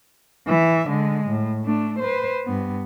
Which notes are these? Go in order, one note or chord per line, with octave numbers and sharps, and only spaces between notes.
E3 E5
D3 G#3
A2
A3 D4
B4 C5
G2 B3